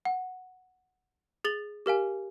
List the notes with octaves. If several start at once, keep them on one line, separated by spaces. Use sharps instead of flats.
F#5
G#4 A6 F#7 G7
G4 A#4 F5 G#5